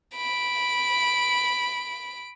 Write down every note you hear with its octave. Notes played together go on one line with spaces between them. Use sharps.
B5 D7